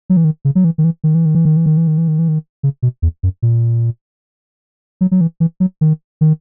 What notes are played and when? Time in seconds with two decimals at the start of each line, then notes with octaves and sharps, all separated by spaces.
0.10 F#3
0.17 E3
0.24 D#3
0.45 C#3
0.55 F#3
0.64 E3
0.78 D#3
0.84 E3
1.04 D#3
1.15 E3
1.26 D#3
1.35 E3
1.45 D#3
1.57 E3
1.66 D#3
1.77 E3
1.87 D#3
1.98 E3
2.08 D#3
2.19 E3
2.28 D#3
2.63 C#3
2.82 B2
3.02 E2
3.23 F#2
3.42 A#2
5.01 F#3
5.11 F#3
5.21 E3
5.40 E3
5.60 F#3
5.81 D#3
6.21 D#3